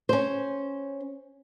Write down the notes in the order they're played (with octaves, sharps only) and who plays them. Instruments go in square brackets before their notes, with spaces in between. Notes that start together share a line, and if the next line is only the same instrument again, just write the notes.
[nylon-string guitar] C#4 C5